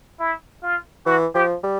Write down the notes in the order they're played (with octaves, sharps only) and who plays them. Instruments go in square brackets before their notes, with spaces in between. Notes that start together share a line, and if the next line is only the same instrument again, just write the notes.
[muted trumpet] E4
F4
[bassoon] E3 [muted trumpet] F#4
[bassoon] F3 [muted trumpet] G4
[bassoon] G3